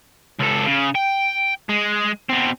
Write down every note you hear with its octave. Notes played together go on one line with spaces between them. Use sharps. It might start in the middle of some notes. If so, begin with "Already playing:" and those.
C#2 A4
C#3
G5
G#3
B2 C4